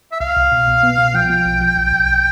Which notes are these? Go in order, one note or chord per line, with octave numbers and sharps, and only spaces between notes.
E5
C2 F5
C2
B2
B2
B3
B2
F3 G5
F3
B1
F3
B1
B1